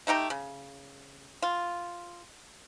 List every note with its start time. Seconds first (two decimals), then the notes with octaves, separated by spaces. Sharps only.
0.07 A3 D#4 G4 A#5
0.30 C#3
1.42 F4